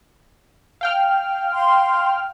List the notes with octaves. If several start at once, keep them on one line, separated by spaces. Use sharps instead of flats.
F5 G5 F6
C6